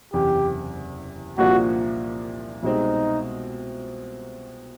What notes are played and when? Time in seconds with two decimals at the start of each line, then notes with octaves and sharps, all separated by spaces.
0.13 F#1 E2 C3 G4
1.38 C2 A#2 F3 A#3 D4 F#4
2.63 C2 B2 G#3 C4 D#4